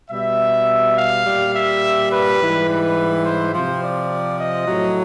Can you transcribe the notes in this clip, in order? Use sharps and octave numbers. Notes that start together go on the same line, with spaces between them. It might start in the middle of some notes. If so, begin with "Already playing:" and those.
B2 G3 E5
F5
A#2 G3
E5
B4
G#2 E3 G3
B4
C5
C3 F3 C5
D5
D#5
A2 F#3